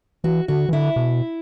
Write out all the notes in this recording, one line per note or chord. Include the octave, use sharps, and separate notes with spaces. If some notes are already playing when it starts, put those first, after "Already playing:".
E3 F#4
D3 F#4
E3
D3 E4
B2